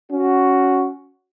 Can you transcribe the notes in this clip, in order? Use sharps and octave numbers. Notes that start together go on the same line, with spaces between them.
C#4 F#4